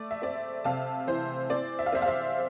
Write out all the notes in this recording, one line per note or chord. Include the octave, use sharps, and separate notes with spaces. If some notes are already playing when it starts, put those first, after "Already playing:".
Already playing: A3 D5
E5
C4 D5
C3 F5 A5
E3 C5
C4 D5
E5
F5
C4 C5 E5
F5
C5 E5